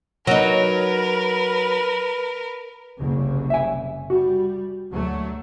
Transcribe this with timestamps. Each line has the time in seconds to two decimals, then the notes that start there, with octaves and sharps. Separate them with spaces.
0.27 F#3 D#4 A#4 B4
2.98 F#1 C2 C#3
3.50 E5 G#5
4.10 G3 F#4
4.91 D2 F#3 A3